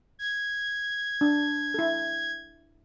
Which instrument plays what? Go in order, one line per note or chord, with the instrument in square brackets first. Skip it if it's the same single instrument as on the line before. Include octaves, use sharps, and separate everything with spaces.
[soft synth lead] G#6
[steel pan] D4
E4 A4